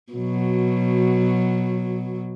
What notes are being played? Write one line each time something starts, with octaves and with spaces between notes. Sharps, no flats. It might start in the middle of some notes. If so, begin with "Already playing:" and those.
B2 F#3